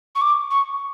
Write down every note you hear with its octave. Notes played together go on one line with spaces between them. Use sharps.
C#6
D6
C#6